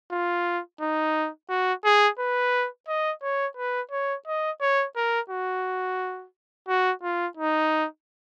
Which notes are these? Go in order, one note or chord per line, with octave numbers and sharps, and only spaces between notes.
F4
D#4
F#4
G#4
B4
D#5
C#5
B4
C#5
D#5
C#5
A#4
F#4
F#4
F4
D#4